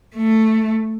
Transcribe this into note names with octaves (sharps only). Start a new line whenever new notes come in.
A3